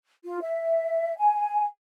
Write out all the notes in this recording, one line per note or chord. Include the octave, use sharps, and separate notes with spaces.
F4
E5
G#5